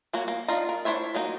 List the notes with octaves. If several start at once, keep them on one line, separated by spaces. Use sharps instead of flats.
F#3 A#3 F#4
A#3
D4 D#4 F4 A#5
A#4
D4 E4 C5 C#5 E5
F#3 A#3 D#4